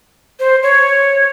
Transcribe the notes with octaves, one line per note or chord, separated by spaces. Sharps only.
C5
C#5